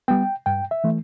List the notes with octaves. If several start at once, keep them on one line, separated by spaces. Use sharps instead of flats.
G3 B3 G5
G2 G5
E5
E3 A3